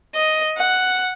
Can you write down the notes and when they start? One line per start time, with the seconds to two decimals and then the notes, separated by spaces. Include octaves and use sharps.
0.14 D#5
0.57 F#5